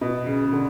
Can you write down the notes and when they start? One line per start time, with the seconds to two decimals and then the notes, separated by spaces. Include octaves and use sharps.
0.01 B2
0.26 C#3
0.45 C#3
0.53 D3